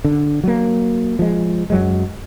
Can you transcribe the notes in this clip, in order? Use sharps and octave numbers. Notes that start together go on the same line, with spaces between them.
D3
F#3 A#3
F3 G#3
F#2 F#3 G#3